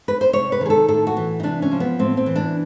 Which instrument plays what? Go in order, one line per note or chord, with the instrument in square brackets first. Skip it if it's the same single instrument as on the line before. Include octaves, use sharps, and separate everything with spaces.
[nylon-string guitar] B4
C5
C3 C#5
B4
D#3 G#4
A4
A2 A4
F#4
E3
D#4
C3 D4
C#4
F3
B3
A2 C4
C4
E3
D4